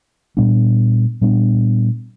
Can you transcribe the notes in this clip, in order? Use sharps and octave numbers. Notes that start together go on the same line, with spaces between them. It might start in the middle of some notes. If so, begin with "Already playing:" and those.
A#2 G3 B3 D4
A#2 G3 B3 D4